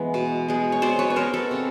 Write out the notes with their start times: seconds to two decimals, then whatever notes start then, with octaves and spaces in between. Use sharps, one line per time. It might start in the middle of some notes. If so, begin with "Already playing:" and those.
Already playing: E3 G#3 B3
0.14 B2
0.48 G#3 B3
0.72 C#5
0.82 B2 C5 D5
0.99 B4 C#5
1.10 C#5
1.16 G#3 B3 A#4 C5
1.34 A4 B4
1.51 C3